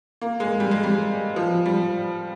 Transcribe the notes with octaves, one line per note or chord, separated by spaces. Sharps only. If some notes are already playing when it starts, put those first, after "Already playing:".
A#3
G#3
G3
G#3
G3
F3
G3